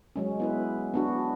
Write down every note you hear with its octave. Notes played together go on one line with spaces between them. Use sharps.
F#3 G#3 C#4
B3 E4 B4
B3 D4 F#4